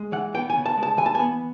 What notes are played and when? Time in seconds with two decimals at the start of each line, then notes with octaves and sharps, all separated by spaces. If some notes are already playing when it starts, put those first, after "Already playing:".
Already playing: G#3
0.12 E3 F#5
0.34 B3 G5
0.50 G#5
0.55 C#3
0.66 A5
0.77 G#3
0.83 A5
0.97 E3 G#5
1.06 A5
1.15 B3 G#5